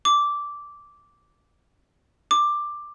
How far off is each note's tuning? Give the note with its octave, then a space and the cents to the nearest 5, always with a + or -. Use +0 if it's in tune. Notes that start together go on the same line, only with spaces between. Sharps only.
D6 -10
D6 +10